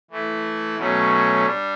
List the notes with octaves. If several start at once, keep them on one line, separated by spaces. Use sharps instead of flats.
E3 A3 E4
B2 F#3 A3 C#4
G3 D4